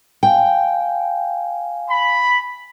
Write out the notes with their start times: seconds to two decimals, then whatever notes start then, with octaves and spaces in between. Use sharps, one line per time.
0.23 F5 G5 G#5
1.90 B5